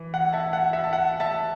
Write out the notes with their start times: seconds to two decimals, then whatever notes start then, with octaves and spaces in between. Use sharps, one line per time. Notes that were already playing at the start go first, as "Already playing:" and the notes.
Already playing: E3
0.14 F#5
0.33 E5 A5
0.53 F#5
0.73 E5
0.84 A5
0.93 F#5
1.20 E5 A5